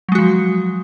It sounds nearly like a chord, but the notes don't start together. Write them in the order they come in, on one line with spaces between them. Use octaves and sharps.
F#3 G#3 F#4 F3